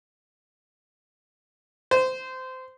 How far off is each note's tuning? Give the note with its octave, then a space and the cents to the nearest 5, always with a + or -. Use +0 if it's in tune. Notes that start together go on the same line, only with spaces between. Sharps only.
C5 -20